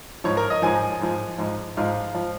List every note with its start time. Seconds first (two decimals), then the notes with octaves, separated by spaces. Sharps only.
0.24 G#2 F3 C#5
0.37 A#4
0.50 D#5
0.62 G#2 F3 G#5
1.01 G#2 F3
1.38 G#2 F3
1.77 G#2 F3 F5
2.14 F3